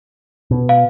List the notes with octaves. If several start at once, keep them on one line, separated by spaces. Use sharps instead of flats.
B2
F5